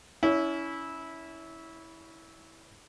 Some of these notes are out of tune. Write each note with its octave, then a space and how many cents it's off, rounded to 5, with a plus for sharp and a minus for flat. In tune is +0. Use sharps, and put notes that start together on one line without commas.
C#4 +25 E4 -15